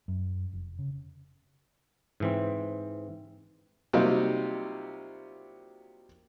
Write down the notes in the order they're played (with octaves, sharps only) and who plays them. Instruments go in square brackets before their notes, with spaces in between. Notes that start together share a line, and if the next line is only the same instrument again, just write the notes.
[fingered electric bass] F#2
F1
C#3
[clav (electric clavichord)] G#2 E3 C4
[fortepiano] C3 F#3 G3 A#3 D#4 F4